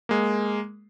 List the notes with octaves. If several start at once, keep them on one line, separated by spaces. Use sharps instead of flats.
G#3 A#3